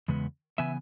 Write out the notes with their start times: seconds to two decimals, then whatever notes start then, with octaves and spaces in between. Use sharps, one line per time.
0.08 E2 C#3 G#3 B3
0.58 C#3 E3 B3 E5 G#5